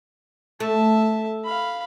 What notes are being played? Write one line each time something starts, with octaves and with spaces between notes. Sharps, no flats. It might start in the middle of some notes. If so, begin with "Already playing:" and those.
A3 E5 A5
F5 B5